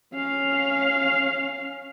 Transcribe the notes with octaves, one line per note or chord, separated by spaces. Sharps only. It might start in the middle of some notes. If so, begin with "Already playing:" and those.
C#4 F5